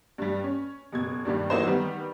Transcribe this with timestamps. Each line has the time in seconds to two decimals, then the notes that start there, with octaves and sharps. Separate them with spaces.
0.18 G2 G3
0.44 C#4
0.92 F#1 B2 G#6
1.25 G2 A#2 D#3 G3
1.50 E3 F#3 A#3 D#4 C5
1.67 D#3 G3 B3